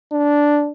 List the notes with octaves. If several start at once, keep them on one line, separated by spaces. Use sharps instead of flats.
D4